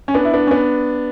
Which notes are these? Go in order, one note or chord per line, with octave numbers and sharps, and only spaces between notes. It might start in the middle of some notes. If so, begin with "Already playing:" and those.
C#4
B3 D4
E4
B3 D4
C#4
B3 D4